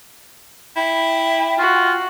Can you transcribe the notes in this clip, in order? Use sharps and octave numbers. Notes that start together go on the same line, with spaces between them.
E4 G5
F4 F#4